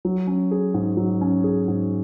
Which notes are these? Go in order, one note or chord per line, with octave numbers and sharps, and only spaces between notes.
F#3
C#4
G#4
G#2
F#3
C#4
G#4
G#2